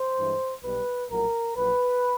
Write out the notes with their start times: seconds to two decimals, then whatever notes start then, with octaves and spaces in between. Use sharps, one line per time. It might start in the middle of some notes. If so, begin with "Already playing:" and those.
Already playing: C5
0.19 G2 E3 G#3
0.63 B1 B2 G3 B3 B4
1.10 A#1 A2 F#3 A#4
1.56 A#1 A#2 F#3 B4